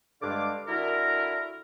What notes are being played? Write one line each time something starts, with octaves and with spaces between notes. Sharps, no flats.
G2 D3 G#3 D4 F5 D6
D3 E4 F#4 A#4